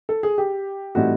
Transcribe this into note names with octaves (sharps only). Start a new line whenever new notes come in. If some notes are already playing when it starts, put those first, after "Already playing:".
A4
G#4
G4
A2 E3 G3 C4 D#4 F#4